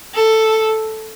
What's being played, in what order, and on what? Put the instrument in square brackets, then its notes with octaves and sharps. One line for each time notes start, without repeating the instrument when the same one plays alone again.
[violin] A4